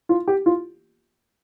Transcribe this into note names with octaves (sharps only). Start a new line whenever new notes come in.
F4
G4
F4